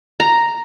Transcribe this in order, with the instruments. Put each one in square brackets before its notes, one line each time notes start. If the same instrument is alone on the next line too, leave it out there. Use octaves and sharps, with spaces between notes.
[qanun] A#5